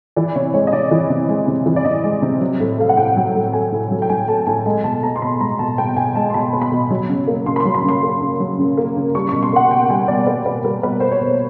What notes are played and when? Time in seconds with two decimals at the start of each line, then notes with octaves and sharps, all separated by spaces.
0.16 E3 D5
0.35 C3 C#5
0.54 G#3 C#5
0.67 D#5
0.73 C3 D5
0.91 E3
1.10 C3
1.29 G#3
1.47 C3
1.66 E3
1.76 D5
1.85 C3 D#5
2.04 G#3
2.22 C3
2.41 F#3
2.60 A2
2.78 A3 F5
2.89 F#5
2.97 A2 G5
3.16 F#3
3.35 A2
3.53 A3 G#5
3.72 A2
3.91 F#3
4.02 G5
4.09 A2 G#5
4.28 A3 A5
4.47 A2 G#5
4.66 G#3 G#5
4.84 B2 A5
5.03 B3 A#5
5.16 C6
5.22 B2 B5
5.41 G#3 A#5
5.59 B2 A5
5.78 B3 G5
5.96 B2 G#5
6.15 G#3 A5
6.30 C6
6.34 B2 B5
6.53 B3
6.62 B5
6.72 B2
6.90 F#3
7.09 C#3
7.27 A#3
7.46 C#3 C6
7.56 B5
7.60 C6
7.65 F#3
7.74 B5
7.84 C#3 C6
8.03 A#3
8.21 C#3
8.40 F#3
8.58 C#3
8.77 A#3
8.97 C#3
9.15 G3 C#6
9.29 B2 C#6
9.43 C6
9.53 A#3 F#5
9.71 B2 G5
9.90 G3 G#5
10.08 B2 D5
10.26 A#3 B4
10.46 B2 B4
10.64 G3 A#4
10.83 B2 B4
11.00 A#3 C5
11.11 C#5
11.21 B2